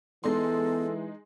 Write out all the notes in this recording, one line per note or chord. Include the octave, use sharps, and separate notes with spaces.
E3 G#3 B3 D#4 A4 C6